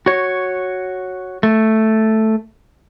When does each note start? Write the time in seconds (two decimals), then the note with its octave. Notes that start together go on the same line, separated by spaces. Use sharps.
0.06 F#4 C#5
1.43 A3